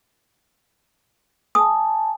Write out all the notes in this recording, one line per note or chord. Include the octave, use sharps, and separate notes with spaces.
G#5 A5 D#6